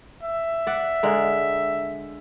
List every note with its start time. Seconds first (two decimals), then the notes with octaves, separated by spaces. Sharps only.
0.23 E5
0.67 D5 F#5
1.03 D3 G#3 A#4